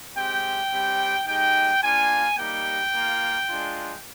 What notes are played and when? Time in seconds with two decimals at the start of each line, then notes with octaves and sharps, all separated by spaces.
0.15 G#3 C4 G4 G5
0.72 G3 C4 G4
1.26 G#3 D#4 G4 G5
1.82 A#3 D4 F4 G#5
2.38 G3 A#3 D#4 G4 G5
2.93 A#3 F4
3.49 G#3 D4 F4